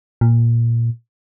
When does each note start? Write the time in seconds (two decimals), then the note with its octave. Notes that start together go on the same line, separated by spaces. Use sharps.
0.21 A#2